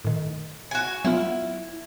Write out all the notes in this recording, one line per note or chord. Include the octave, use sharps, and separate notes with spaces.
A2 D#3
F#4 G#5
F#3 B3 E4 F4